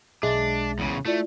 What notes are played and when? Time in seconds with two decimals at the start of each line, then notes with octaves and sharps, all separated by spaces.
0.23 B1 G#3 D4 E5 A6
0.79 E2 C#3
1.05 A3 E4 F4 D5